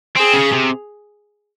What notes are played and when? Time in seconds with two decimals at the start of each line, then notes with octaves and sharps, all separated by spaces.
0.17 C4 G#4
0.34 C#3
0.53 C3